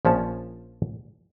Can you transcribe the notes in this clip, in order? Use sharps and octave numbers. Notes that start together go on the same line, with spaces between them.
A#1 F3 C#4 A5